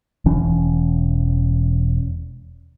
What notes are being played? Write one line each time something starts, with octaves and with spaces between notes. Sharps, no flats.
E1 E3 C#4